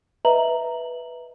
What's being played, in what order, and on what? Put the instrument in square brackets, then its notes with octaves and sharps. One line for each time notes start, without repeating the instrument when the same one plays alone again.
[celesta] B4 D#5 E5 A#5 F#7